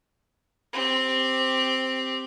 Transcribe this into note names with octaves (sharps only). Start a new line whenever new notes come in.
C4 G4